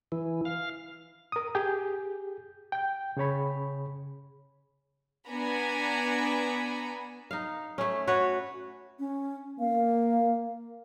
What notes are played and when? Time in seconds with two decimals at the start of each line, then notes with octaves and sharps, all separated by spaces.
0.12 E3
0.45 F5
1.32 A#4 D#6
1.55 G4 G#4 G6
2.72 G5 G6
3.17 C#3 G#4 C#5 B5
5.27 B3 D4 G#5 A#5 B5
7.31 D#4 F5
7.78 A3 C#4
8.07 F#4 B4 C#5 F#5
8.99 C#4
9.60 A#3 F5